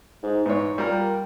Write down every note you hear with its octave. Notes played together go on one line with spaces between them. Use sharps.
G#2
G#2 E3 C#5
A#2 G3 A#4